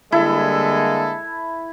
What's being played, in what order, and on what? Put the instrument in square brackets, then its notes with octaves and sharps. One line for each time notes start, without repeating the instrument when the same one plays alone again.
[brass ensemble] D3 G3 A#3 [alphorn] G#3 [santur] E4 [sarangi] A4